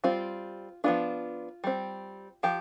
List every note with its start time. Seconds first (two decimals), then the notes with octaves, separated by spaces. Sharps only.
0.04 G3 C4 F4
0.84 F3 B3 D4 F4
1.64 G3 C4
2.43 F3 G4